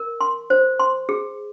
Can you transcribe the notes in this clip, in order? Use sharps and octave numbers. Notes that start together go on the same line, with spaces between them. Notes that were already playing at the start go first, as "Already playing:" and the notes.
Already playing: A#4
C6
C5
C6
G#4